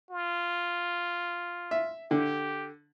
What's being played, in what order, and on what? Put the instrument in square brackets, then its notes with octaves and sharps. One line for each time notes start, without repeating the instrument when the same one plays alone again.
[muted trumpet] F4
[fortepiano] E5
[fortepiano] D3 [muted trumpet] G4